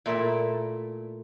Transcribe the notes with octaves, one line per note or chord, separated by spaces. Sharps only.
A#2 A3 E4 D5 E5